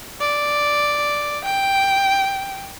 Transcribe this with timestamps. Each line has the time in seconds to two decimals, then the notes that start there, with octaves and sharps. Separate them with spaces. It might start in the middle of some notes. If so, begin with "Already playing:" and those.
0.20 D5
1.45 G5